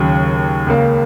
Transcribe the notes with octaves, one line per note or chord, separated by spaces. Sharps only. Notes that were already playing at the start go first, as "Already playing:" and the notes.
Already playing: D#2 C#3 F#3
C#2 C#3 A#3